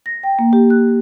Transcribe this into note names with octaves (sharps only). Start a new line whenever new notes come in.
A#6
G5
A#3
G4
F#6